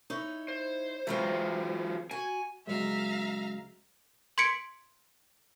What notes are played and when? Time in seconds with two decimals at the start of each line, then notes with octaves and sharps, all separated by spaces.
0.10 D#4 E4 C#5
0.48 C5
1.07 E3 F#3 G#3 C4 F4
2.11 F#4 G#5
2.67 C#2 F#3 G#3 E5 F5 A#5
4.38 C6 G#6 B6 C#7 D7